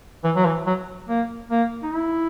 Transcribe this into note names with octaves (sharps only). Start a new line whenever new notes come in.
E3
F#3
E3
F#3
A#3
A#3
D#4
E4